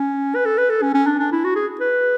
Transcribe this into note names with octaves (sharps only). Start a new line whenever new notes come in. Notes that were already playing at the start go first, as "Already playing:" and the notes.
Already playing: C#4
B4
A4
B4
A4
C#4
C#4
D4
D4
E4
F#4
G#4
B4